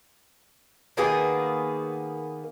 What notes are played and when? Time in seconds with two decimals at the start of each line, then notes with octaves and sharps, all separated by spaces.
0.97 D#3 A#3 B3 G#4